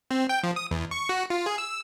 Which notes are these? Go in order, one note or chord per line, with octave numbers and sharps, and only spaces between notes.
C4
G5
F3
D#6
E2
C#6
F#4
F4
G#4
E6